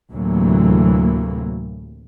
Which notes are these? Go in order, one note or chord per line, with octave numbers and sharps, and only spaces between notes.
D2 A2 C3 E3 F#3 A#3